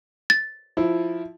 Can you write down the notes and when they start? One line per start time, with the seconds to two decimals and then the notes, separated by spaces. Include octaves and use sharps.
0.30 A6
0.77 F3 E4